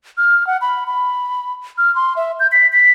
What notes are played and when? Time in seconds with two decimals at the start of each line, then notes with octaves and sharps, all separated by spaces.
0.17 F6
0.47 F#5
0.61 B5
0.86 B5
1.78 F6
1.95 C6
2.16 E5
2.40 G6
2.52 B6
2.73 B6